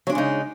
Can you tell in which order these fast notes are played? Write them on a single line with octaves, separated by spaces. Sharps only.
F#3 D4 G#3 C#3 D#4